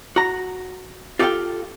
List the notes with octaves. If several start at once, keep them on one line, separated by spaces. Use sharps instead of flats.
F#4 A#5
F4 G4 A4 D5 F5 G5